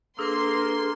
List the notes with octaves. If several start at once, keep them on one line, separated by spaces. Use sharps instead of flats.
A#3 D4 G#4 A4 B4 C6